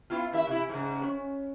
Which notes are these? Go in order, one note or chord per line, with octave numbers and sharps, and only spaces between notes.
B3 E4 F4
D#2 E4 E5
C3 E4
G#2 C#3
C#4